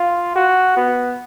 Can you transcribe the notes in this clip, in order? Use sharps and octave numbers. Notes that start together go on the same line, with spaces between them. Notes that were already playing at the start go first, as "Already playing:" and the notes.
Already playing: F4
F#4
B3